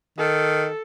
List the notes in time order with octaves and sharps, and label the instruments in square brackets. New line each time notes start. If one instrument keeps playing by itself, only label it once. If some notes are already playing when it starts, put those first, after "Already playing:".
[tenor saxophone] D#3 [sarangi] A4